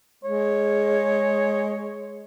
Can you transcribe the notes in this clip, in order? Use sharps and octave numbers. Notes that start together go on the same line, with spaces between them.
G#3 C#5